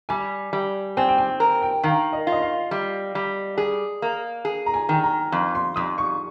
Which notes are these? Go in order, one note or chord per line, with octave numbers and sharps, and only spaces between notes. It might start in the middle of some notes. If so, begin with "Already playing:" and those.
G3 G#5
G3
C4 G#5
G5
G#5
A#4
G5
D#3 F5
D#5
F4
D#5
F5
G3
G3
G#4
A#3
G#4
A#5
G#5
D#3 G#5
A#5
F2
C6
F2 D#6
C#6